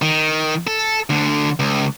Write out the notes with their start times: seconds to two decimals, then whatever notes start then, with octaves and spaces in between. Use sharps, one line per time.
0.02 D#3
0.67 A4
1.10 D2 D3
1.59 C#2